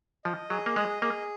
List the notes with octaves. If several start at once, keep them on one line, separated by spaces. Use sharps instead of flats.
F3 D#5
F#3 G#4
A#3
G#3 D#5
A#3 G#4